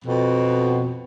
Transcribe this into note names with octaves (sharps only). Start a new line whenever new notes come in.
F2 B2